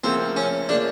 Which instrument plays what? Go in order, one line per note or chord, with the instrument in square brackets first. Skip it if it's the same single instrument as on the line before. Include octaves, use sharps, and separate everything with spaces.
[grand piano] D2 C#3 F3 A#3 [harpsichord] C4
[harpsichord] C#4
[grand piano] C#3 F3 A#3 [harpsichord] D4